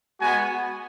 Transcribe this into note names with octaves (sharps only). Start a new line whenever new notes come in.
G#3 B3 F#4 G#5